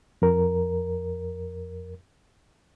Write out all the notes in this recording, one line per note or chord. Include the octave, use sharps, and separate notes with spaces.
F2 A#4